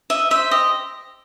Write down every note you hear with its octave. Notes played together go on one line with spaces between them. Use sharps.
D#5 E5
C5 E5
G4 D#5